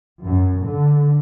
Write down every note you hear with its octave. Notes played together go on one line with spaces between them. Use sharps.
F#2
D3